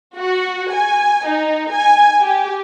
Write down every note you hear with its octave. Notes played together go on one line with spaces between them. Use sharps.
F#4
G#5
D#4
G#5
G4